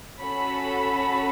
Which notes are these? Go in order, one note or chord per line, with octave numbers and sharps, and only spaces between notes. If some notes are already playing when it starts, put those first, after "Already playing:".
C#4 F#4 A4 B5